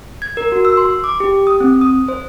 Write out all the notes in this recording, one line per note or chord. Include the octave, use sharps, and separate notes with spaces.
G#6
A#4
F#4
E6
C6
D6
G4
D#6
C4
D#6
C5